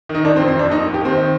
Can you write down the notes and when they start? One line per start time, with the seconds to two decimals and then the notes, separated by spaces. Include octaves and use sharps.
0.09 D#3
0.15 D#4
0.25 D#3 D4
0.36 C4
0.40 F2
0.48 C4
0.56 F2 D4
0.70 D#2 D#4
0.86 D#2
0.94 G4
1.01 D#3 C4
1.17 D#3